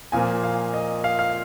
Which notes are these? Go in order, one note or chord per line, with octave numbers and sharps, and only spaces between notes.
A#2 F3 A#3 G#5
F5
D#5
F5
F5